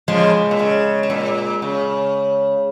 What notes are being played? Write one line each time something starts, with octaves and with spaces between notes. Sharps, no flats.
C#3 F3 G#3
A#2
C#3
C#3
A#2
C#3